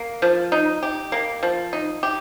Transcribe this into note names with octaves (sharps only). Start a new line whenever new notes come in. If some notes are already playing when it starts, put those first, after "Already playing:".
Already playing: A#3
F3
D#4
G4
A#3
F3
D#4
G4